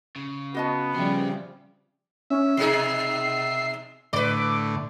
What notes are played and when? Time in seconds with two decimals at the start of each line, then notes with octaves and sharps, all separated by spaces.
0.16 C#3
0.54 B3 F#4 D#5 A5
0.95 C#3 F3 G3 C5 E5
2.30 C#4 E5
2.57 B2 D#4 G#4 C7
4.13 A2 D3 B4 D5 D6